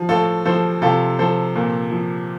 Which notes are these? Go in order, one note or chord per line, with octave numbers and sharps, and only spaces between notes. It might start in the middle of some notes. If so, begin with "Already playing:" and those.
Already playing: F3
A2 F4 A4
F3 A4 C5
C3 F4 A4
F3 A4 C5
A#2
F3